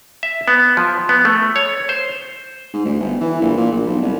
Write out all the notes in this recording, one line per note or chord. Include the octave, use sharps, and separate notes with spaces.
E5
B3
F3
B3
A3
C#5
C5
G#2
D2
G1
E3
A#1
A#2
A#1
B1
C2